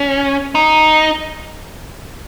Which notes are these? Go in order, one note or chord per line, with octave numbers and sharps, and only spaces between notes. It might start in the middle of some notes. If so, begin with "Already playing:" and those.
Already playing: C#4
D#4